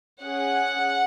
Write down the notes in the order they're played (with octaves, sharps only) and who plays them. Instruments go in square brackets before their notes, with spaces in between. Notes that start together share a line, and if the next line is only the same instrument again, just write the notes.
[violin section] C#4 G#4 F#5